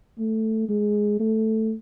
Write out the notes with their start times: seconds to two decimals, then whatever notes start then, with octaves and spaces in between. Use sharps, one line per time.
0.18 A3
0.69 G#3
1.20 A3